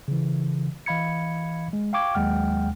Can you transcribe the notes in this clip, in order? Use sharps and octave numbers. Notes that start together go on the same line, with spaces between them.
C#3 E3
E3 D#5 F5 B5 G#6 C#7
G#3
F5 G5 C#6 D6 G#6
D#2 F#3 G#3 F#5 G5 F6